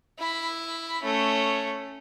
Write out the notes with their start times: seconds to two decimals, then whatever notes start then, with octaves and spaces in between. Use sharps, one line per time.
0.19 E4 B5
1.02 A3 C#4